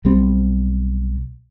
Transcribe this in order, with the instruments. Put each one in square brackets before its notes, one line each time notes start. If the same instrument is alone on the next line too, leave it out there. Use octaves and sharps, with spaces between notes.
[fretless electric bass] B1 G3 C4